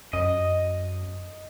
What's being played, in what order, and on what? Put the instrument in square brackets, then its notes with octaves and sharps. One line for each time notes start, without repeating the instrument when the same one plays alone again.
[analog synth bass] F#2 [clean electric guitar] D#5